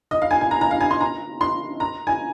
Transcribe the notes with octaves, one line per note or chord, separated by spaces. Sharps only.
D#5
F5
G#5
G#5
A#5
A#5
F5
G#5
C6
A#5
C6
A#5
G#5